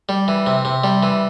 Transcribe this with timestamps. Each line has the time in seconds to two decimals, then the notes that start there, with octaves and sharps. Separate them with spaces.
0.09 G3
0.28 E3
0.47 C3
0.65 C3
0.84 G3
1.03 E3